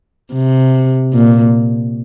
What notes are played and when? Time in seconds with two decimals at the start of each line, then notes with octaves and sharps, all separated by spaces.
0.33 C3
1.13 A#2